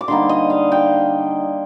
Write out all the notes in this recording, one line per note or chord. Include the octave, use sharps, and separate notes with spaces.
D6
D3 G3 A#3 D#4 C6
D#5
F5
G5